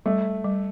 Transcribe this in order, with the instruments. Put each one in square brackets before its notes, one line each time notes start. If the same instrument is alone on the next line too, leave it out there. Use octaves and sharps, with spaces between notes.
[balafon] G3 [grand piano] A3
[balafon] G3